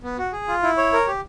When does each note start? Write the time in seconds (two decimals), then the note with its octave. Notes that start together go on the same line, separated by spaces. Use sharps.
0.03 B3
0.18 F#4
0.33 G#4
0.48 F4
0.63 E4
0.77 C#5
0.93 A#4
1.07 G4